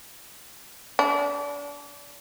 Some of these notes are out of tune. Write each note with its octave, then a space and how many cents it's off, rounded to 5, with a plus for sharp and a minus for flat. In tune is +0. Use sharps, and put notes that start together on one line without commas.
D4 -30